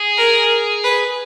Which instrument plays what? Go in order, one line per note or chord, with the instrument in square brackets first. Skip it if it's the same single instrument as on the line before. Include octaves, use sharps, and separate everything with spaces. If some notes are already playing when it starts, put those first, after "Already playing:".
Already playing: [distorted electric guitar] G#4
[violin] A#4
B4